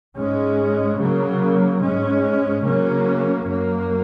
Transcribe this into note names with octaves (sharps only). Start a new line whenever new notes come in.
G#2 G#3 C#4
C#3 F#3 A#3
G#2 G#3 C#4
C#3 F#3 A#3 C#4
F#2 F#3 A#3